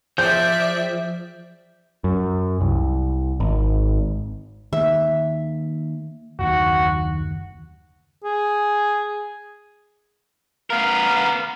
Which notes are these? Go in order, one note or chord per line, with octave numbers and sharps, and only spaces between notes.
F3 G#4 C5 D5 E5 G5 G6
F#2
C2
G#1
D#3 A#3 E5
F#1 D#2 D#3 F#4
G#4
B3 A#4 F5